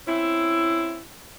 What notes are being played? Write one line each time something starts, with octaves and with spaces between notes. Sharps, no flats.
C4 C#4 E4